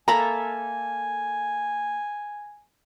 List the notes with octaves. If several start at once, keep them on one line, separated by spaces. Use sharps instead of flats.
A#3 A4 E5 G#5 A#5 B5